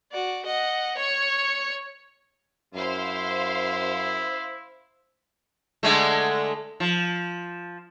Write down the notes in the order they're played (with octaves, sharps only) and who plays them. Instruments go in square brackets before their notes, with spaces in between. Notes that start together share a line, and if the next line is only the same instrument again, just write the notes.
[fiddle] F#4 D5
D#5 F#5
C#5 C#6
[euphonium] F#2 [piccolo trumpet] E4 [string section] C5 F5
[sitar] D3 G#3 A3
F3